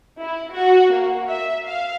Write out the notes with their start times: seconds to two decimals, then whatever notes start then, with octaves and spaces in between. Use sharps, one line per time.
0.21 E4
0.53 F#4
0.92 A#3
1.29 E5
1.65 F5